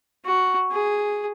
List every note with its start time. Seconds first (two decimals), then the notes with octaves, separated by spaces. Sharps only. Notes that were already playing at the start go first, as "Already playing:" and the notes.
0.25 F#4
0.71 G#4